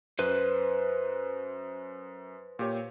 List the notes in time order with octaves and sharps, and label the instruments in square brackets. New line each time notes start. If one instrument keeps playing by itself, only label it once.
[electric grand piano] F#2 [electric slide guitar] B4 C5
[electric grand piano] A#2 G4 C#5